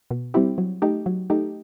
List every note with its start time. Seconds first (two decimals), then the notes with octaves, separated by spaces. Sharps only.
0.11 B2
0.34 G3 C4 E4 G4
0.58 F#3
0.82 A3 D#4 G4
1.06 F#3
1.30 A3 D#4 G4